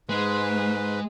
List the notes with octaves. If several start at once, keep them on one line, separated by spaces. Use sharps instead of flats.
G#2 G#3 B4